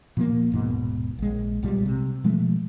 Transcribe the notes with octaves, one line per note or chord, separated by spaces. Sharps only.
A#2 F3 G3 A#3
D#1 G#2 B2
A#1 G#3
B1 A#2 G3 G#3
C3
B2 F3 G#3 A3